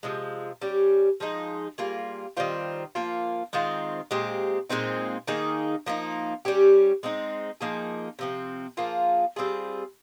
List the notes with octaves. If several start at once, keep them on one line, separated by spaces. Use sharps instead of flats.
C3 F3 G#3
G3 C#4 G4
F3 G#3 D#4 G#4
G3 A#3 F4 G#4
D#3 G3 C4 F4
F3 A#3 F4
D#3 G#3 C4 F4
A#2 G#3 C4 G4
A#2 G#3 C4 D#4
D#3 A#3 D#4 G#4
F3 A#3 D#4
G3 C#4 G4
G#3 C4 D#4
F3 A#3 D#4 G#4
C3 F3 C4
F3 A#3 F4 G#4
G3 C4 F4 G#4